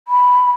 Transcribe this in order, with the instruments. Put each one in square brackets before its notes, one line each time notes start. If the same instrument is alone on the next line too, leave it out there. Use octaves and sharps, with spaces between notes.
[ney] B5